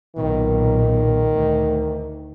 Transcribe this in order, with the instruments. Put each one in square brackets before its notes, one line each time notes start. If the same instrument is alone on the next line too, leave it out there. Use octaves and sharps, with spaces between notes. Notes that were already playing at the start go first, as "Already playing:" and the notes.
[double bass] B1 A#2 [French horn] D#3
[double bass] D2